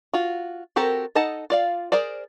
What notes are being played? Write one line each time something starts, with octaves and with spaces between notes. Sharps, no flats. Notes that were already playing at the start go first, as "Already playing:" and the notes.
F4 F#4
C4 F#4 G4 A4 A#4
D#4 A4 D#5 F#5 A5
F4 D5 F5
G#4 A#4 C5 D5